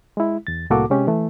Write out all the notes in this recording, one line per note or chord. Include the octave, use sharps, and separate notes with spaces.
G#3 E4
E2 A6
C2 A2 A#3 F#4 A4 D6
C3 G#3 C#4 G4
E3 A3